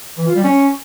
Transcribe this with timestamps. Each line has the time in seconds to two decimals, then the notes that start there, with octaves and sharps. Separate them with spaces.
0.18 E3
0.26 F4
0.35 G3
0.44 C#4